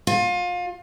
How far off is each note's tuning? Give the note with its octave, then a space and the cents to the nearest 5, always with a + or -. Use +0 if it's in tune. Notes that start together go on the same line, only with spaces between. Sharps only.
F4 +30